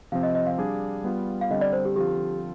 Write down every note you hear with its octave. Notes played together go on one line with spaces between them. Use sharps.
C3 F3 C4 F5
D#5
D#5
F5
G3 D4 G#4
G3 B3 F4
F5
D3 G3 C4 D#5
D5
C5
G4
D3 F3 C4 F4 G4